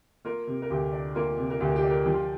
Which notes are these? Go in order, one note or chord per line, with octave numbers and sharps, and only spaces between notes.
A#3 F4 A#4
C3
A#4
D2 G4
D4
A#3 F4 A#4
C3
A#4
D2 G4
A#4
G4
D4
A#4
F3 G4
F4